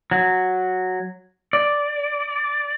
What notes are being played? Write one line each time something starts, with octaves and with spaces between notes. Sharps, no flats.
F#3
D5